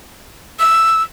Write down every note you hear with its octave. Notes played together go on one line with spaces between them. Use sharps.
E6